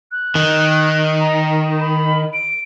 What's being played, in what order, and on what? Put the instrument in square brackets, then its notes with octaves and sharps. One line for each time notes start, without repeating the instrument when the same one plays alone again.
[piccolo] F#6
[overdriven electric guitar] D#3
[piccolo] A#5
B5
D7